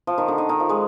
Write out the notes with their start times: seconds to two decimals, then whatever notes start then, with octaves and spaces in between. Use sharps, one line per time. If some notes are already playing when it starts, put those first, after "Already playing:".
0.07 F3
0.18 D#3
0.28 D3
0.38 D#3
0.49 D#3
0.60 F3
0.69 G#3